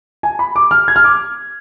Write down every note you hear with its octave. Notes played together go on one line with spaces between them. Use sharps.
G#5
B5
D6
F6
G#6
F6
D6